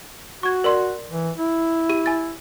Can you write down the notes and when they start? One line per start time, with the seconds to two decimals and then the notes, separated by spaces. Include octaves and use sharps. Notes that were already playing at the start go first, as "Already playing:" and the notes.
0.43 F#4 C#6 G#6
0.64 A#4 D5 C6
1.09 E3
1.37 E4
1.89 G4 D#7
2.06 G#5 A6